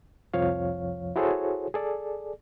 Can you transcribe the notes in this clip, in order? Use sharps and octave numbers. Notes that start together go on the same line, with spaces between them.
C2 F2 F3 C#5 F5
E4 F#4 G#4 A4 C5 C#5
G#4 A4 D5